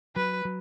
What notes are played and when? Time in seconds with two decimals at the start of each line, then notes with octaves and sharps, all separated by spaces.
0.16 F#3 B4
0.45 F#3